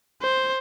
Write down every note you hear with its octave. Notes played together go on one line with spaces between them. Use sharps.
C5